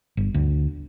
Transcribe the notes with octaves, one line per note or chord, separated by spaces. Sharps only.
G1
D2